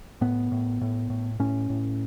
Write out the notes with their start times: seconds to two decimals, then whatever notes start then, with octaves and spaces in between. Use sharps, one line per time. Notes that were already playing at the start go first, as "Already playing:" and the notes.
0.21 A2 B3
0.52 A2
0.81 A2
1.10 A2
1.39 A2 C#4
1.70 A2